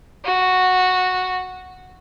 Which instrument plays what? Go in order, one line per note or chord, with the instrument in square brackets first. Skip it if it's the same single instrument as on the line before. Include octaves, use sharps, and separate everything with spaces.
[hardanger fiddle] F#4